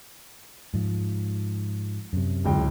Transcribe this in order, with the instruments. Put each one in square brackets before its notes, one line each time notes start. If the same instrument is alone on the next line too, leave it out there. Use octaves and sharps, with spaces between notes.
[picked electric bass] G#2 F3
F#2 C3
[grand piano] D1 C#2 G5